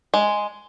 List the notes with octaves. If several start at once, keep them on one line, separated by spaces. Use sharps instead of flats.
G#3